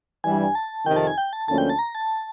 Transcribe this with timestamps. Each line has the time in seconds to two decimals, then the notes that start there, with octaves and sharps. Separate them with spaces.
0.24 G2 E3 G3 G#5
0.55 A5
0.86 F2 C3 D#3 G5
0.96 A5
1.07 G#5
1.18 G5
1.33 A5
1.48 D2 D3 F3 A#3 C#4 A5
1.58 G5
1.69 A5
1.79 A#5
1.95 A5